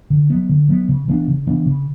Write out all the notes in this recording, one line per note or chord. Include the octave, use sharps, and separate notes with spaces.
D3
F#3 B3
D3
F#3 B3
C#3
E3 B3 D4
C#3
E3 B3 D4
C#3